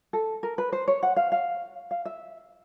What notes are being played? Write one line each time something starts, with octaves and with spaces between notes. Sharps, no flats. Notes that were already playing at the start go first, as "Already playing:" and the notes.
A4
A#4
B4
C5
C#5
F#5
F5
F5
F5
E5